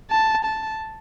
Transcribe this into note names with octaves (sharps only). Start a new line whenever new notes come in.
A5
A5